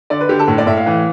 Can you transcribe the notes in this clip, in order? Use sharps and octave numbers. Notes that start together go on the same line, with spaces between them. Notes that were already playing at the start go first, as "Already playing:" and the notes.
D3 D5
B4
D3 G4
A4
A2
D5
A2 E5
F5
E3